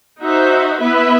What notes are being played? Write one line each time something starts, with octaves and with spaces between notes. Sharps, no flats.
D#4 F#4 C5 E5
B3 E4 B4 E5